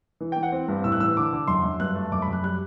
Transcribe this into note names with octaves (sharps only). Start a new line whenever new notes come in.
E3
E3 G5
F#5
C4
G2
A2 E6
F#6
E3 E6
D3 D6
D3
F#2 C6
F#2
G2 F#6
A3
F#2 D6
B5
F#2 F#6
G3 F#6